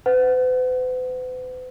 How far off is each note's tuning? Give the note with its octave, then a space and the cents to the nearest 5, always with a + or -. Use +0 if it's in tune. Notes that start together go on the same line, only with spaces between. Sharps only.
B4 +45 F#5 +0